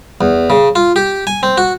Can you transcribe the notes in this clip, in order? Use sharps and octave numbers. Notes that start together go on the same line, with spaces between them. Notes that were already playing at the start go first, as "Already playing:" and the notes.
E2
C#3
F4
G4
G#5
C4
F#4